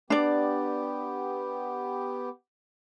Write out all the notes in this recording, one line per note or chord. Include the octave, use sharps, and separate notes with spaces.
B3 D4 G4 D5